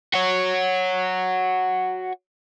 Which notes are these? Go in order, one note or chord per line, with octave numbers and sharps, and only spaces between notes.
F#4 C#5